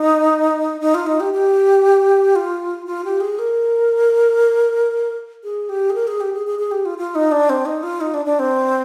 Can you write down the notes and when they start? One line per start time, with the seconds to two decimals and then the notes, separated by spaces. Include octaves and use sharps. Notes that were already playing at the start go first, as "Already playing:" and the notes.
Already playing: D#4
0.81 D#4
0.94 F4
1.07 D#4
1.20 G4
1.33 G4
2.36 F4
2.86 F4
3.05 G4
3.21 G#4
3.39 A#4
5.44 G#4
5.69 G4
5.90 G#4
5.95 A#4
6.07 G#4
6.21 G4
6.33 G#4
6.47 G#4
6.59 G#4
6.72 G4
6.85 F4
6.98 F4
7.15 D#4
7.32 D4
7.50 C4
7.66 D#4
7.83 F4
8.01 D#4
8.14 D4
8.26 D4
8.39 C4